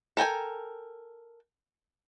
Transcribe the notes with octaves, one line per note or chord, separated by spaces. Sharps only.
A4 A#4 G5 G#5